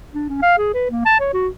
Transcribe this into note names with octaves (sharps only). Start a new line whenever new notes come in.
D4
C#4
F5
G#4
B4
A#3
A5
C#5
F#4